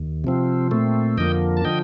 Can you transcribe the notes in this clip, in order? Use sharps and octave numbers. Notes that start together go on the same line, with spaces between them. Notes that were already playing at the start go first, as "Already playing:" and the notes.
Already playing: D#2
C3 F3 C4
A#2 A3 C4
F2 D3 F3 A#3 D#5 G5
A5
D3 F3 D#5 G5